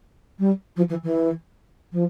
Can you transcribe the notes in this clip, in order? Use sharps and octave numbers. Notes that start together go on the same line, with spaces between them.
G3
F3
E3
E3
F3